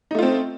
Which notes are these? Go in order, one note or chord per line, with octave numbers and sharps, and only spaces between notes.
A3 C4 D#4 F4